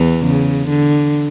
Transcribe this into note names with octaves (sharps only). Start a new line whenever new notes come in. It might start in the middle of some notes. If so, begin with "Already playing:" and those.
Already playing: E2 E3
C#3
D3